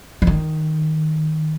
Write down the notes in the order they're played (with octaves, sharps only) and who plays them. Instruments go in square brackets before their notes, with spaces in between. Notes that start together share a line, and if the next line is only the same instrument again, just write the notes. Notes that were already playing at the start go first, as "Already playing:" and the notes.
[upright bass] F3
D#3